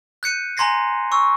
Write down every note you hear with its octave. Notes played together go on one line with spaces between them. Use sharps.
F#6 G6 C#7 D#7
G#5 A#5 C6 G#6 A#6 C7
C#6 E6